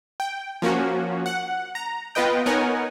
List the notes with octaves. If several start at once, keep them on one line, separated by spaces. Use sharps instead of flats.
G5
F3 A#3 C#4 F#4
F#5
A#5
B3 F4 B4 D#5 G5
B3 D#4 A#4 C#5 F#5 G#5